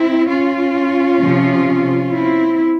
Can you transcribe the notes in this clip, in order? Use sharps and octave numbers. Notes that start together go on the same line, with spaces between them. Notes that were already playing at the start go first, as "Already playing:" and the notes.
Already playing: C4 E4
C#4 F4
C3 F3
C4 E4